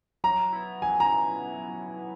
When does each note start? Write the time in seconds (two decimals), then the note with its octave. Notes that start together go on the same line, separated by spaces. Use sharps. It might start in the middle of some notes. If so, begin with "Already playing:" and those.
0.24 F#3 A#5
0.53 B3 E4
0.82 F#3 G#5
1.00 A#5